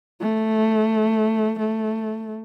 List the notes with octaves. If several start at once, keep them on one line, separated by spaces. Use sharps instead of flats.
A3
A3